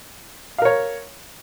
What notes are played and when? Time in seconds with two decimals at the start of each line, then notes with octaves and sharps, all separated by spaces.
0.58 F5
0.62 A#4
0.65 C#5